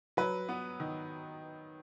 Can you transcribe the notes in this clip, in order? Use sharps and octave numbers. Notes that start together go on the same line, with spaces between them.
F#3 B4
B3
D#3